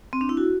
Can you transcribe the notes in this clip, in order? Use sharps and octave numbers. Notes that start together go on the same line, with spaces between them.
C4
D4
E4
F#4